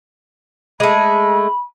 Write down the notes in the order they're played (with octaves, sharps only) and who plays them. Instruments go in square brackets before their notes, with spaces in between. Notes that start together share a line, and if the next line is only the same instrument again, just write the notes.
[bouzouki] G#3 A3 [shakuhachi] B5